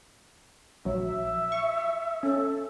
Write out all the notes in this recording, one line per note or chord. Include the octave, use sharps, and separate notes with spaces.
A#1 F#3 E5
C#6
C#4 A4